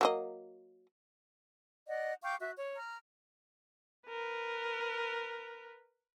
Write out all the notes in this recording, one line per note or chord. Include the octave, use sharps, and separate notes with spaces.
F#3 A#3 D#5
D5 D#5 F#5
F5 G5 C#6 D6
F#4 E5
C#5
A#5 F6
A#4 B4